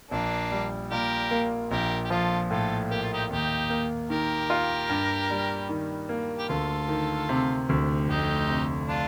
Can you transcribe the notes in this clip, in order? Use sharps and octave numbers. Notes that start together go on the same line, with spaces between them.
A#1 A#3 D4
G3
A#2 G4 A#4
A#3
A#1 G4 A#4
G4
F3 F4 A4
A2 F4 A4
A#3 G4
F4
D#4 G4
D#2 D#4 G4
A#3
D#3 G4 A#4
F4
G2
G3
D#3
A#3
G4
D2 F4 A4
D#3
C3
D2
F1 D#4 G4
C3
D4 F4